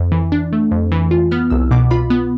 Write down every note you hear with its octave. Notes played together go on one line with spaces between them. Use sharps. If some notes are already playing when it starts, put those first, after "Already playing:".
Already playing: F2
E3
D4
A3
F2
E3
F4
B3 F6
C2 E6
B2 D6
F4 B5
B3